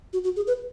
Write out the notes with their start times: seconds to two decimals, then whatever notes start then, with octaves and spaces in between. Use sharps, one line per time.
0.13 F#4
0.24 F#4
0.36 G#4
0.47 B4